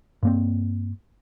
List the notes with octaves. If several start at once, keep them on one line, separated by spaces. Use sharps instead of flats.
G2 A#3 C4